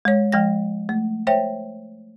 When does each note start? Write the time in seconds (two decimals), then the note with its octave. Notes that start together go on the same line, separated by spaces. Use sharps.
0.05 G#3 C#5
0.32 F3 G#3 G5 A#6
0.89 A3
1.27 C5 C#5 E5 G5